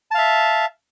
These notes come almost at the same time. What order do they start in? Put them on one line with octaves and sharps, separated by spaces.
A5 F5 E5